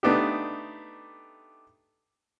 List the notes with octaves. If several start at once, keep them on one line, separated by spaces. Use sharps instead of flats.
A3 B3 D4 D#4 G4